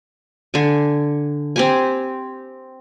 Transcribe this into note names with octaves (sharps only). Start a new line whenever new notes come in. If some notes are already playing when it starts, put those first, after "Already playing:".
D3 G#5
C4 G4 G#5